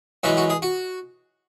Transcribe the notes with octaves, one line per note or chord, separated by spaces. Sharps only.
F#2 E3 G#3 F#4
F#4
G#4
F#4